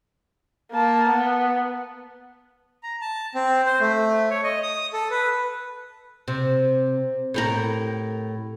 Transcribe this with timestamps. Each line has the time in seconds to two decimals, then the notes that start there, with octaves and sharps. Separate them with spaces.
0.72 A#3 A5
1.10 B3
2.83 A#5
3.01 A5
3.35 C4
3.66 C5
3.80 A3
4.31 C#5
4.44 D#5
4.63 D#6
4.93 A4
5.11 B4
6.28 C3
7.34 A2 G4 A#4